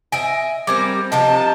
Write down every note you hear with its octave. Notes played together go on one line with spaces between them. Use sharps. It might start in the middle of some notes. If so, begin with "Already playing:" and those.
D#5 E5 G#5 D7
G3 C4 A#4 D6 G#6
C3 F3 F4 D#5 A5